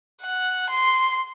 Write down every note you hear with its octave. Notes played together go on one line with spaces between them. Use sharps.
F#5
C6